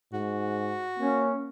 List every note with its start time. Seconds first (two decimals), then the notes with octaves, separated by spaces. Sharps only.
0.13 G#2 F#4
0.98 A#3 C#4